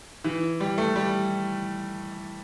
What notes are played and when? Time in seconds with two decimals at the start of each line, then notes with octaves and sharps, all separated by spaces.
0.24 E3
0.60 G3
0.78 A3
0.96 G3